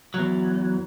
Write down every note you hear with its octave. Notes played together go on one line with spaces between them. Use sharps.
E2 F#3